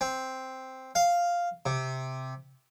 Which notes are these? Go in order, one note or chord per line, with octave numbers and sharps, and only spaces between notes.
C4
F5
C3